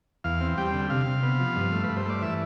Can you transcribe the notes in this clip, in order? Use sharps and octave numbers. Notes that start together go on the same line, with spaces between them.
E2 F5
C4
G3 G5
D3
C3 F5
C3
B3
F3
G2
A3
B4
G2
C5
A3 D5
E3 E5